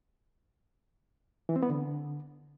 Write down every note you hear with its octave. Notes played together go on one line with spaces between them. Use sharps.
E3
C4
B3
D3